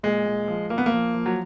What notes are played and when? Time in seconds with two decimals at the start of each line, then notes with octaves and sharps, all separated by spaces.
0.03 A#2 G#3
0.26 A#2
0.48 F3
0.70 A#2 A#3
0.78 B3
0.86 A#3
0.92 F3
1.14 F3
1.26 F#3